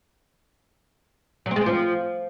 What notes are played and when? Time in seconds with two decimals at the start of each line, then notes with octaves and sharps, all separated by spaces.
1.46 F#3
1.51 C4
1.56 G#3
1.61 C4
1.66 F3